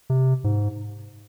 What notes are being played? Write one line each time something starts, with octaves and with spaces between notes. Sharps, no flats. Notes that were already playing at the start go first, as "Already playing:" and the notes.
C3
G#2